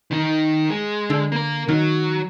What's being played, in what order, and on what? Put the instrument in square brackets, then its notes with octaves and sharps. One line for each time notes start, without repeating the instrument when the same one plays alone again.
[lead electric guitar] D#3 D#4
G#3
[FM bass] D3
[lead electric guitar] A#3 A#4
[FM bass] D#3 [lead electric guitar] F#3